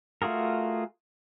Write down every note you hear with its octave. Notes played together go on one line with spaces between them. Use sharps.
A3 F4 F#4 G#4 A#4